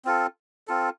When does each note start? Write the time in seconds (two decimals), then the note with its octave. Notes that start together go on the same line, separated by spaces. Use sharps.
0.05 C4 F4 A4
0.68 C4 F4 A4